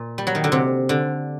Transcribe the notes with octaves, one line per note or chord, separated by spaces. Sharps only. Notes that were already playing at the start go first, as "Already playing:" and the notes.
Already playing: A#2
G3
F#3
D#3
D3
C3
D3